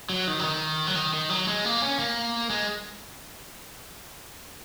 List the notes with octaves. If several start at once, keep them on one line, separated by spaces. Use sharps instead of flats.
F#3
D#3
F#3
D#3
F#3
D#3
D#3
F#3
G#3
A#3
C#4
A#3
G#3